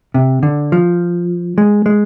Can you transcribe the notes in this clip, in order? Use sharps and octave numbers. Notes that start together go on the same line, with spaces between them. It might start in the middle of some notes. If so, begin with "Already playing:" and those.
C3
D3
F3
G#3
G#3